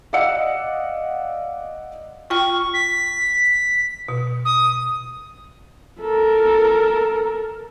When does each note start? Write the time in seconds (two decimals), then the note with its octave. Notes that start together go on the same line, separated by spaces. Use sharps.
0.13 D5 D#5 F5 F#5 E6 C#7
2.30 F4 G5 C#6 F6
2.74 B6
4.08 B2
4.45 D#6
6.00 A4 A#4